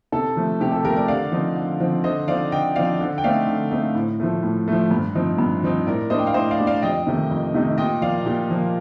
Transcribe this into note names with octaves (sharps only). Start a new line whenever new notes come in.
C3 A4
F3 A3
C3 G4
A4
F3 A3 G4 A#4
A#4 D5
D3 D5 F5
F3 C4 D#4
D3
F3 C4 D#4
D3 C5 D#5
F3 C4 D#4 D5 F5
D3 D#5 G5
F3 C4 D#4 D5 F5
D3
G5
A3 C4 D#4 D5 F5
D3
A3 C4 D#4
A2
F3 A3
A2
F3 A3
G2
F3 C4 D#4
G2
F3 C4 D#4
A2 A#4 D5
G3 D4 C5 D#5
G5
F5
A2 C5 D#5
D5 F5
G3 D4
D5 F5
F2 D#5 G5
C3 D#3 A3 D#4
F2
C3 D#3 A3 D#4
A#2 D#5 G5
F3 A#3 D5 F5
A#2 G4
F3 A#3